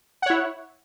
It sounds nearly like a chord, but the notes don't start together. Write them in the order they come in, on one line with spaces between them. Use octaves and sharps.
F#5 C#5 E4